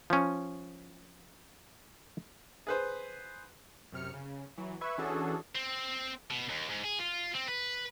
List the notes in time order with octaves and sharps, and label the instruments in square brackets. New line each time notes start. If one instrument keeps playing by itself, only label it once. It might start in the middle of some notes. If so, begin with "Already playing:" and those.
[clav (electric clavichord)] F3 C#4
[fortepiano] G#4 B4 C5
[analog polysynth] F#2 C3 F6 C#7
C#3
E3 F#3
B4 E5 C#6 G#6
E3 C#4 D4 F#4 G#4 A4
[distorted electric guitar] C4
B2
D#2
G#2
G#4
F4
C4
B4